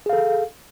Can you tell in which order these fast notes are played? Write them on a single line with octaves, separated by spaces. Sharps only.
G#4 F5 A4